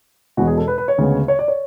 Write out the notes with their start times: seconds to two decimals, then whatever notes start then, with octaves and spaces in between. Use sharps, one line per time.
0.37 E1 E2 B2 F#4
0.47 G#4
0.57 A4
0.68 B4
0.78 B4
0.88 C#5
0.98 D2 C#3 G#3 B3
1.28 C#5
1.39 D5
1.48 C#5